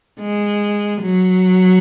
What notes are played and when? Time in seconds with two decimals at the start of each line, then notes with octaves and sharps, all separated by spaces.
0.20 G#3
1.01 F#3